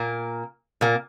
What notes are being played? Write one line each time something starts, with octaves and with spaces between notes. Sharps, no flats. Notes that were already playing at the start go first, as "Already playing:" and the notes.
Already playing: A#2 A#3
A#2 A#3